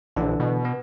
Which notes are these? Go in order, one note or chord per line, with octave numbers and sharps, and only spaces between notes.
A#1 D3 E3 D4
B2
B3